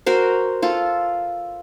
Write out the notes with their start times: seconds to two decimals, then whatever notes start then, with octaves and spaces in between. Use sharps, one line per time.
0.06 F#4 A#4 C5
0.62 F4 A4